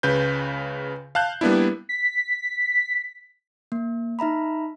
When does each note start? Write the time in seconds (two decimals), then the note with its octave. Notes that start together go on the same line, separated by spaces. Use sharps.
0.03 C#2 C#3 B4 G6
1.15 F5 A5 F#6 G6
1.41 G3 A#3 B3 D4 E4
1.89 B6
3.72 A#3
4.19 D#4 E5 A#5 B5